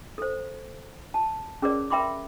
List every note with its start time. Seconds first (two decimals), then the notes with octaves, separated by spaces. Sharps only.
0.18 A4 C5
1.14 A5
1.62 C#4 G#4 A#4 B4 C#5 D5
1.90 A#4 E5 G5 B5 C6 D6